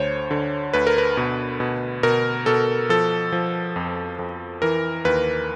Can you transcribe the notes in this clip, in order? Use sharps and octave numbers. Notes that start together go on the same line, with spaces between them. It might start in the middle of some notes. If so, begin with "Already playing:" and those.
Already playing: D2 D3 C5 C#5
D3
D2 B4
A#4
B4
B2
B2
B2 A#4
B2 A4
F3 A4
F3
F2
F2
E3 A#4
D#2 B4